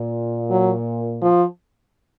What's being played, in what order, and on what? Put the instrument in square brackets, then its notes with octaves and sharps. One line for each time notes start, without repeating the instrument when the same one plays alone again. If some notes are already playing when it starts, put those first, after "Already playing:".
Already playing: [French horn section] A#2
[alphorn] F#3
F3